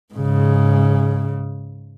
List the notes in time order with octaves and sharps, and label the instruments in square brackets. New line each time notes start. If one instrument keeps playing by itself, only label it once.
[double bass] G#2 C#3